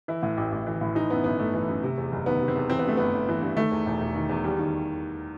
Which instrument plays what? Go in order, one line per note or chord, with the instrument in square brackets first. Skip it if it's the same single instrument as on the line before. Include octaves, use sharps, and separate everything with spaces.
[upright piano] E3 E4
A2
A1
A1
E3
A2
E3 D#4
F#2 B3
G1 B3
G1 A3
E3
F#2
C3
E2
F#1
D#3 B3
C3
C4
E2
E3 C4
B3
G2 A3
G1 B3
G1
E3
G2
D#3 A3
E2
E1
E1
D#3
E2
D#2 G3
D#3